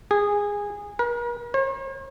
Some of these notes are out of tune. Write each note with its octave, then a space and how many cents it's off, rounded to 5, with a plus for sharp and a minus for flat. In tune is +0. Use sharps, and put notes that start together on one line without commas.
G#4 -15
A#4 +45
C#5 -45